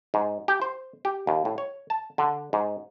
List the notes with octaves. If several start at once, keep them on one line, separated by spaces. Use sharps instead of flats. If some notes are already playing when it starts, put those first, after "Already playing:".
G#2
G4
C5
G4
D#2
A2
C#5
A5
D3
G#2